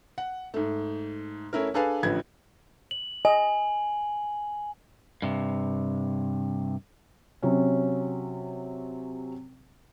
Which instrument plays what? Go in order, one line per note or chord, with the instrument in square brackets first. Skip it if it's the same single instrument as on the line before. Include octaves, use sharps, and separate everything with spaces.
[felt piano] F#5
G#2 A3
A3 C#4 E4 A#4
D4 G#4 A4 B4 F5 G#5
A1 D3 F3 B4 G#6
[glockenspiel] F#7
[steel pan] D#5 [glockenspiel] G#5
[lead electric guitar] G2 C3
[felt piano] C3 F#3 C#4